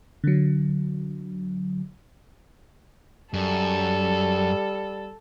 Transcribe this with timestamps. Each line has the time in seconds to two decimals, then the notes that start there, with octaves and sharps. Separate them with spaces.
0.24 D3 F#3
3.34 F#2 G3 A4